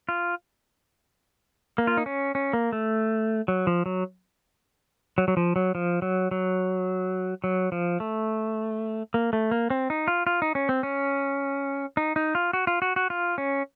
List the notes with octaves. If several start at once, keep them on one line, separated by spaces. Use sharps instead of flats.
F4
A#3
F4
D#4
C#4
C#4
A#3
A3
F#3
F3
F#3
F#3
F#3
F3
F#3
F3
F#3
F#3
F#3
F3
A3
A#3
A3
A#3
C4
D#4
F4
F4
D#4
C#4
C4
C#4
D#4
D#4
F4
F#4
F4
F#4
F#4
F4
C#4